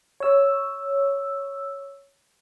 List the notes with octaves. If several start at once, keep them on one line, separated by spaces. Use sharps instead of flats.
C#5 E6